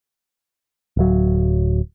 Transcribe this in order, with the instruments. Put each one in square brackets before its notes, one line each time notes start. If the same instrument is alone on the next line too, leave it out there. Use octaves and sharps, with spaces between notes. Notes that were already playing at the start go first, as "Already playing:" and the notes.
[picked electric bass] D1 F#3